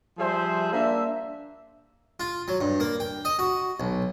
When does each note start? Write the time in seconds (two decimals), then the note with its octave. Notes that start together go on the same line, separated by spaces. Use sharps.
0.18 F3 G3 G#4 C5 E5
0.73 A#3 D4 E5
2.20 F4
2.48 F#3
2.61 G2
2.80 A#3
3.00 G5
3.25 D#5
3.39 F#4
3.80 B1